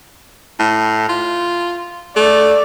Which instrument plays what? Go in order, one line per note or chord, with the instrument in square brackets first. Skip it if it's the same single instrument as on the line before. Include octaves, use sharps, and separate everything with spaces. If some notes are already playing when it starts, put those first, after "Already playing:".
[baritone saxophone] A2
F4
[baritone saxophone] A3 [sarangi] D5